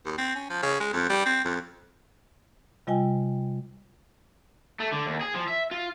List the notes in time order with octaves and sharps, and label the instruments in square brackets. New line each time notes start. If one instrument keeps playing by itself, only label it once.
[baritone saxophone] D#2
C4
C#4
F3
C#3
G#3
F2
G3
C4
F2
[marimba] C3 G3 F4 D#5 G5 G#5
[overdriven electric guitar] A3
D3
D#2
G#4
F3
E5
F4